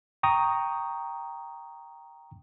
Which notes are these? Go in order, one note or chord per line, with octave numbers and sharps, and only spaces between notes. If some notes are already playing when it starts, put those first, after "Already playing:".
G5 A#5 C#6 D#6